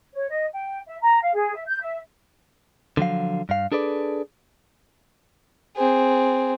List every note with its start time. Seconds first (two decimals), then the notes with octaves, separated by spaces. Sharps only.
0.15 C#5
0.29 D#5
0.52 G5
0.86 E5
1.01 A#5
1.22 F5
1.34 G#4
1.54 E5
1.67 G6
1.81 E5
2.97 D3 F3 F#3 F5
3.49 G2 F5
3.72 D4 G#4 A4 B4 D5
5.77 C4 G#4